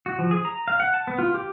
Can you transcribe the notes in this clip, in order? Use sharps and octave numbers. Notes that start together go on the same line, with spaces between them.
F#4
F3
G#4
A#5
F5
F#5
A5
B3
F4
G4